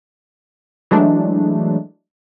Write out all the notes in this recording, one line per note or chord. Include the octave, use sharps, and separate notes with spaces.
E3 F#3 G#3 A3 D4